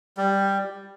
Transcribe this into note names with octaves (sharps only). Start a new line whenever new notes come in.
G3